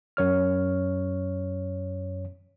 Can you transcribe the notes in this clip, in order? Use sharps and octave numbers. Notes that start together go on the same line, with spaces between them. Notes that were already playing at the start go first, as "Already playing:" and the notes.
F#2 C#5 F6